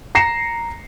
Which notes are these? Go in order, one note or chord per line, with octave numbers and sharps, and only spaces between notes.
A#5 A#6 C7 C#7 E7